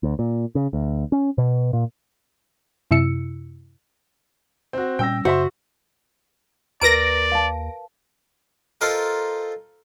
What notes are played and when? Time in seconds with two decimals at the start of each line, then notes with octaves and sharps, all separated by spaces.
0.03 D2
0.19 A#2
0.55 C#3
0.73 D2
1.12 C#4
1.38 B2
1.73 A#2
2.91 F#2 C3 E4 E6 C#7
4.73 C4 F#4
4.99 A#2 G3 C#4 G5 E6 A#6
5.25 F#2 C#3 F#4 C5 E5 C6
6.81 D#2 A#4 B4 D5 A#5 A#6 D7
7.32 F5 A5
8.81 F4 A4 A#4 C5 D#5 G5